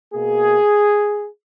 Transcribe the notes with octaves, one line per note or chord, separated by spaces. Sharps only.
B2 A#3 G#4